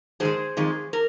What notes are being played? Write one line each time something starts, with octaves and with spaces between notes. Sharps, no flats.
G#2 D#3 G#3 G#4 C5
F2 D#3 G#3
A#4